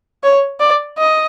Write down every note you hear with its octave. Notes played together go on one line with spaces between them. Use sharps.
C#5
D5
D#5